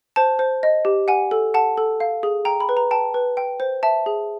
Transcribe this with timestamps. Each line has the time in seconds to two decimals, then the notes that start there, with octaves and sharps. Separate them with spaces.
0.16 C5 A5
0.39 C5
0.63 D#5
0.85 G4
1.08 F#5 G#5
1.31 A4
1.54 F#5 A5
1.78 A4
2.00 F5
2.23 G#4
2.45 G5 A#5
2.60 B5
2.69 B4
2.77 A#5
2.91 G5 A5
3.14 B4
3.37 G5
3.60 C5
3.83 E5 A5
4.06 G#4